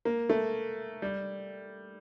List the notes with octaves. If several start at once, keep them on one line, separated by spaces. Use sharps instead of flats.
A#3
A3
G3